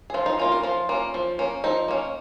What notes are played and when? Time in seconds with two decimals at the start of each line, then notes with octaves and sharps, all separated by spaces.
0.10 G#4
0.14 F3 F4
0.26 D#4
0.38 A#3 C#4 F4
0.52 A#4
0.63 F3 F4
0.89 A#3 C#4
1.14 F3
1.39 A#3 C#4
1.64 F3 D#4
1.88 A#3 C#4